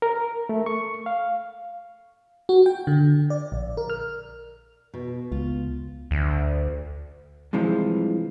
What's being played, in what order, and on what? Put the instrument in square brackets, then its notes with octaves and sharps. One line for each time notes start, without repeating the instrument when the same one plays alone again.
[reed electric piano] A#4
A3
C#6
F5
[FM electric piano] F#4
G5
D3
D5
A#1
A#4
F6
[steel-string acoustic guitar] B2
[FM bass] C#2 [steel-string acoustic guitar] F4
[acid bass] D2
[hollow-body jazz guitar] G2 C3 E3 F3 G#3